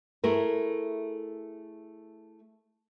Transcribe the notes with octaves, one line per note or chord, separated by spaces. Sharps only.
A3 E4 G#4 A#4